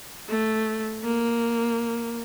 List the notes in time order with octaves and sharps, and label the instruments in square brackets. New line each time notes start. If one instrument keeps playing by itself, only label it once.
[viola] A3
A#3